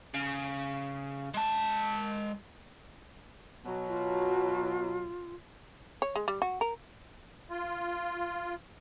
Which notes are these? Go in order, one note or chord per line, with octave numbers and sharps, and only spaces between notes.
C#3
G#3 A5
B2 F#3
F4
C#5
G#3
G3
F#4
A#4
F4